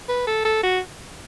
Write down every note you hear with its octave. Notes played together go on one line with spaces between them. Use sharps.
B4
A4
A4
F#4